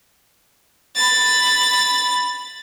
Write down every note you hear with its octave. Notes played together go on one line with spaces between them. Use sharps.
B5 A6